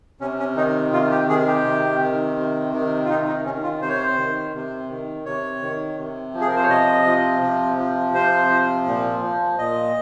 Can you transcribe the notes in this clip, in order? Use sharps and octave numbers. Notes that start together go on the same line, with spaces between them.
C3 C#4
C#4
D#3 D#4
C3 F4
G4
D#3 G#4
G4
C3
D#3
C3
D#3
F4
C3 D#4
D#4
D#3 C#4
F4
C3 C5
C#5
C5
D#3
C3
D#3
C3 C#5
D#3
C3
F3
G#4
A#4
C5
C#5
C3 D#5
F3
C3
F3
C3 C5
F3
A#2
F3
A#2 D#5